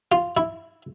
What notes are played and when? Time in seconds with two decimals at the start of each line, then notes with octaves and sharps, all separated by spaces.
0.12 F4
0.37 E4